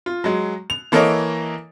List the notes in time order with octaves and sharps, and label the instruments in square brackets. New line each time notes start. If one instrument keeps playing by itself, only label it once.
[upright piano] F4
F#3 G#3
F7
E3 A#3 A4 A#4 C#5 D#5